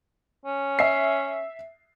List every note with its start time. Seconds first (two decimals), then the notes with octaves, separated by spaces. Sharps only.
0.46 C#4
0.79 E5 C7